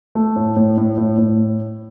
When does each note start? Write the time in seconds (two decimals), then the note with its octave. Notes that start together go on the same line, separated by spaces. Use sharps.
0.15 A3
0.36 A2
0.57 A2
0.78 A2
0.98 A2
1.18 A2